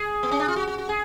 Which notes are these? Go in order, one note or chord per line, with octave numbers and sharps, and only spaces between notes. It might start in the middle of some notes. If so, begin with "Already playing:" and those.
Already playing: G#4
B3
C#4
D4
F4
F#4
F#4
F#4
G#4